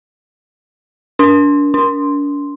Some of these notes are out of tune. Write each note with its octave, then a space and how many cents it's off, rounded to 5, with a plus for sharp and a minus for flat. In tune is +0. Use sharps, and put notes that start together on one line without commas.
D4 -30
D4 -40